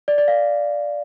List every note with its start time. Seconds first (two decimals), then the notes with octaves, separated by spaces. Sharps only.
0.08 D5
0.18 D5
0.28 F5